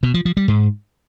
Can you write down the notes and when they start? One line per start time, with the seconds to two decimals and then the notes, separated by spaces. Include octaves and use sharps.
0.03 B2
0.14 F3
0.25 F3
0.37 G3
0.48 G#2